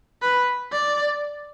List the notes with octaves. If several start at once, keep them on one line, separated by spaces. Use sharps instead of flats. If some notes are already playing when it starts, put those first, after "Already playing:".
B4
D5